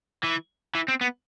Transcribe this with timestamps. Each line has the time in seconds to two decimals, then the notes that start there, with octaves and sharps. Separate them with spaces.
0.23 E3
0.75 E3
0.88 C4
1.01 B3